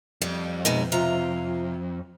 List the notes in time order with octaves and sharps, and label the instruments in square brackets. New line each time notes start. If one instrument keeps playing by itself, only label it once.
[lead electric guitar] F2 [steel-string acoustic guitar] G3
[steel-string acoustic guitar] B2 G#3 D#4
C3 F4 A#5